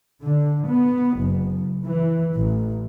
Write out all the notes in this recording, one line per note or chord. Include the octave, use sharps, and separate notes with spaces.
D3
B3
F#1
E3
A1